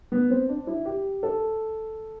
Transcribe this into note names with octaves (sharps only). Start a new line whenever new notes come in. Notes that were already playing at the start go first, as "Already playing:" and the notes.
B3
C4
D4
E4
G4
A4